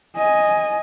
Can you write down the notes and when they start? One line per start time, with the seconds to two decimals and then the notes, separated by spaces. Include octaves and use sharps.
0.17 D#5 G#5